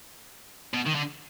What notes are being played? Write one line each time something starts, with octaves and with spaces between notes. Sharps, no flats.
B2
D#3
D3